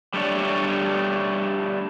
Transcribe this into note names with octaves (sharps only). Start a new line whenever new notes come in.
G3 A3 D4 C#5 D5